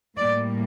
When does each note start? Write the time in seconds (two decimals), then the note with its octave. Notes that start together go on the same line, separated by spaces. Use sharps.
0.17 A2 G3 A#3 D5